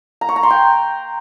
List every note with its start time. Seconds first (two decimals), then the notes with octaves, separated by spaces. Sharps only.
0.21 A#5
0.29 C#6
0.36 A#5
0.43 C6
0.51 G5